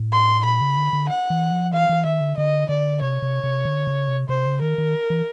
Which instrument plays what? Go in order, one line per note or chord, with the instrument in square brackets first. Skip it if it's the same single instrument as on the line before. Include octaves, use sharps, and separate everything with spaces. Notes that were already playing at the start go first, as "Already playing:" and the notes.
Already playing: [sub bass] A2
[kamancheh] C6
[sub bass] A#2 [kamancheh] B5
[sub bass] C#3
D3
D3
[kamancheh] F#5
[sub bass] E3
F3
[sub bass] E3 [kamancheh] F5
[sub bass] E3
[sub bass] D#3 [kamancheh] E5
[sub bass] D3
[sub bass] D3 [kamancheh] D#5
[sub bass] D3 [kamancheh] D5
[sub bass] C3 [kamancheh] C#5
[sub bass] C3
C3
D3
C#3
C3
[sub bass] C3 [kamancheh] C5
[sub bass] C#3
[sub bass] D#3 [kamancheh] A#4
[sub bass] D#3
E3